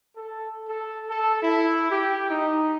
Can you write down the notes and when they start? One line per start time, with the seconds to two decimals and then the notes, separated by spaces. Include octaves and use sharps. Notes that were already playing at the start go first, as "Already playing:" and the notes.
0.17 A4
0.69 A4
1.09 A4
1.43 E4
1.91 G4
2.30 D#4